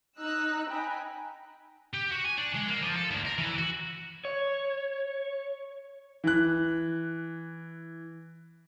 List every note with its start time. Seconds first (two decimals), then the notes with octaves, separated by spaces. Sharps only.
0.20 D#4 E6 F#6
0.69 G5 G#5 A#5 B5
1.94 G4
2.12 F#4
2.25 G#5
2.38 D4
2.55 G#3
2.67 A#3
2.81 F3
2.95 A4
3.11 D2
3.26 A#4
3.38 E3
3.58 F#4
4.25 C#5
6.24 E3 F#6